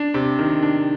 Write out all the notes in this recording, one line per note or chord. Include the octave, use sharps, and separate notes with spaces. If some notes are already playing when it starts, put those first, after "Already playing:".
Already playing: D4
C3
D#3
D4